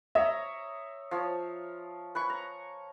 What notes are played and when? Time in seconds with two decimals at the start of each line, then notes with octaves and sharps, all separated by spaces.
0.15 C#5 D#5 E5 A#5
1.11 F3 C#5
2.15 B4 G#5 C#6
2.30 A#5